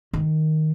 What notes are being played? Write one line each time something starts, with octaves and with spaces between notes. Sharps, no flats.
D#3